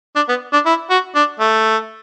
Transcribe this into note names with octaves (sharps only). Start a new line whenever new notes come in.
D4
B3
D4
E4
F#4
D4
A3